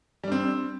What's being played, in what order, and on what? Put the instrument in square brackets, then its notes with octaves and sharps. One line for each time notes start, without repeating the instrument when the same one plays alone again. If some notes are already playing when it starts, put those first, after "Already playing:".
[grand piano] G3
D4
C4